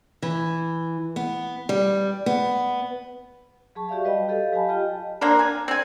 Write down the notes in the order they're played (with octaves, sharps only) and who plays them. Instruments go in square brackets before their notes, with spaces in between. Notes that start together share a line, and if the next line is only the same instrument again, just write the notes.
[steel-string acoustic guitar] E3
B3
G3
B3
[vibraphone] F#3 G#4 A5 C#6
F#4 G4 D5 E5 F5
G3 B4 D#5 G5 B5
G4 A4 D#5 F5
F#3 G4 F5 G#5 A5 B5
F4 G4 D#5 G5
[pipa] A#3 C4 D4 A#4
G#5
C4 G#5